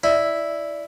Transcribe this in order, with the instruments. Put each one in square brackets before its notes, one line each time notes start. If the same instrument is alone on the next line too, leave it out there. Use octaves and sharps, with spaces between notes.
[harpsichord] E4 [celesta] D5